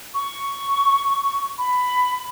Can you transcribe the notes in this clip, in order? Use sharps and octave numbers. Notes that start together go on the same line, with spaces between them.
C#6
B5